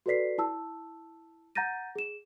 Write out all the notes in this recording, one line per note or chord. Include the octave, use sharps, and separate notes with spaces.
F#4 A4 B4 D5 B6 C7
E4 A5 E6
F#5 A#5 G6 A6 A#6 D#7
G#4 E7